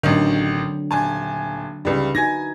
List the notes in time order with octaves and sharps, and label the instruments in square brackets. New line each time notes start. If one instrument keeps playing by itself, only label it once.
[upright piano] A1 D#3 [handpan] D3 F#3 C4
[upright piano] D#1 G#5 A5
[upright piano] C#2 G3 [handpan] D#4 E4 B4
[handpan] D#4 F#4 [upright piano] G#5 G#6 A#6